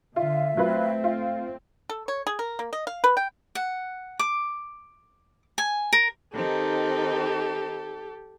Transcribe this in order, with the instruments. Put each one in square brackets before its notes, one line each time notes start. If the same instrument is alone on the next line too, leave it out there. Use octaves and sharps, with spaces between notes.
[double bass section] D3 [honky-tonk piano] F4 [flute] E5
[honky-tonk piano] F#3 F4 B4 [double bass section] A3 C4
[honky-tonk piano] F4
[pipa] A4
C#5
G#4
A#4
A#3
D#5
F5
B4
G5
[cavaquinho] F#5
D6
G#5
A#4
[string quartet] D#3 C4 D#4 [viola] G4 A4